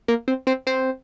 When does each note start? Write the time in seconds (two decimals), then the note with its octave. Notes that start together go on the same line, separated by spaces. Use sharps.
0.08 A#3 A#4
0.28 C4 C5
0.47 C4 C5
0.67 C4 C5